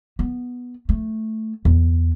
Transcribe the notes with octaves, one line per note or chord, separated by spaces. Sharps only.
B3
A3
E2